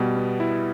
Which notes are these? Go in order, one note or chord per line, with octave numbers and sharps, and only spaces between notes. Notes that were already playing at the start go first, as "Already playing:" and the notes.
Already playing: B2 G3
B3
E4